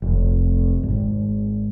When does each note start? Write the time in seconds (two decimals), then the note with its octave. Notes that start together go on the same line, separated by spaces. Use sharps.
0.02 F1
0.83 G#1